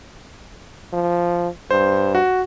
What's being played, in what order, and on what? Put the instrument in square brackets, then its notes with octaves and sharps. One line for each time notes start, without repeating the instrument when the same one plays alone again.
[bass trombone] F3
[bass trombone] G2 [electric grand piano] C5
[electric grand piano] F#4